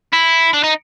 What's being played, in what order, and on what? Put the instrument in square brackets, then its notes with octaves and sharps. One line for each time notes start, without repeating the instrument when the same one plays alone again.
[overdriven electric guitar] E4
D4
D#4